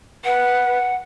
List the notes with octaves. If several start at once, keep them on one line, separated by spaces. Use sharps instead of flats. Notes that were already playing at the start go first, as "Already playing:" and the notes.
B4 F#5